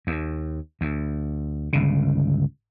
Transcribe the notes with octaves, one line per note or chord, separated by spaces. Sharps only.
D#2
D2
G1 C#2 C#3